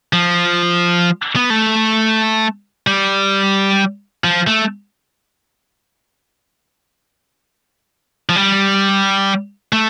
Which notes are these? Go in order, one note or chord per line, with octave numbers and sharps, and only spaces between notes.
F3
B3
A3
G3
F3
A3
F3
G3
A3